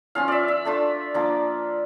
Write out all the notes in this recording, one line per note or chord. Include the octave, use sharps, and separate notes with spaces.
F3 C#4 F4 F5
D5 E5
E5
A3 D4 F4
F3 A#3 D4